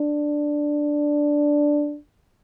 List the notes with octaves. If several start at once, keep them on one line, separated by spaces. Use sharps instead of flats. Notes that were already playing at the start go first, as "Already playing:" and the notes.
Already playing: D4